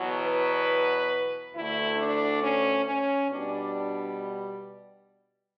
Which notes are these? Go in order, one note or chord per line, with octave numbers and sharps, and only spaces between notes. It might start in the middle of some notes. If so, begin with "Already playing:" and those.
Already playing: E2 B2 F#3
B4
D2 D3 A3 E4
D4
C#4
C#4
B2 G3 D4